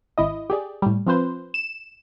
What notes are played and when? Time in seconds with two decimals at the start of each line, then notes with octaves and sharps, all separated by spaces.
0.18 G#1 E4 D#5
0.50 G4 G#4 D5
0.82 A2 G3
1.06 F3 C4 F4 B4 C5
1.54 E7